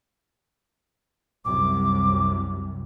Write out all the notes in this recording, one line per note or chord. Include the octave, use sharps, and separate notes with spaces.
C2 F#2 C3 D6